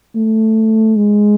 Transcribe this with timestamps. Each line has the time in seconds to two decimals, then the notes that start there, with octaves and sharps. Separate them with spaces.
0.15 A3
0.96 G#3